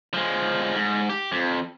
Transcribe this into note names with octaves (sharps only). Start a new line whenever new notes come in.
F3 G#3
G#2
G4
F2